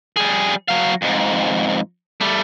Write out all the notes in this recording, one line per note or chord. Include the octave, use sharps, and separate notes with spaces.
G3 G#4
F#3 F5
F2 G#2
G3 A3